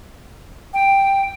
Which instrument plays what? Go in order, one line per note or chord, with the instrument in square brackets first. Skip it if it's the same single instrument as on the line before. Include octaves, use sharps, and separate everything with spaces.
[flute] G5